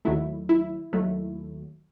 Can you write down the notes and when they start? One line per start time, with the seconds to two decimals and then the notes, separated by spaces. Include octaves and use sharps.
0.05 D#2 D#3 F#3 A3 E4
0.49 E4
0.93 D#2 D#3 F#3 A3